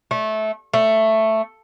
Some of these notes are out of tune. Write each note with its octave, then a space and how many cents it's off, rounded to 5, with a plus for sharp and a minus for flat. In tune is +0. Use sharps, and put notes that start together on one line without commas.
A3 -20
A3 +5